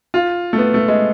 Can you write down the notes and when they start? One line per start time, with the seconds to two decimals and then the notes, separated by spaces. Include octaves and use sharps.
0.14 F4
0.53 A3
0.58 B3
0.74 A3
0.88 G#3